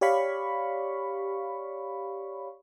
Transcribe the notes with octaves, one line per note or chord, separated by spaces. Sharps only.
G4 C#5 D5 F5 B5 C#6